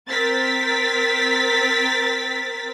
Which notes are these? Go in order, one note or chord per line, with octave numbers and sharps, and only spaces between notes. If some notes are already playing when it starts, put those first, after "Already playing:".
C4 A#4 A6 B6